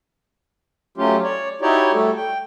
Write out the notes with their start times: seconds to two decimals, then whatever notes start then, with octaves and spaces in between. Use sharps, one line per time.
0.97 F#3 A3 C#4 F4 G4
1.23 C#5 D5
1.61 D#4 E4 F#4 G4 C#5 D5
1.93 G3 A3 F#4 A4
2.16 G5